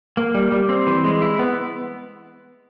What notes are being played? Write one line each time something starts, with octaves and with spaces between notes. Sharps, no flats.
A#3
G3
G3
C4
E3
G#3
E4
B3